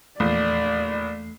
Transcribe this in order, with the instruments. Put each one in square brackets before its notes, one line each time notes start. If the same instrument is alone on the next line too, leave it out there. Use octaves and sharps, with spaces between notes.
[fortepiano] A#1 [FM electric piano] E2 C7 [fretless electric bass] A3 [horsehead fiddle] D5